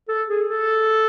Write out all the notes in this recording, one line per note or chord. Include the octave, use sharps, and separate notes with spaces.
A4
G#4
A4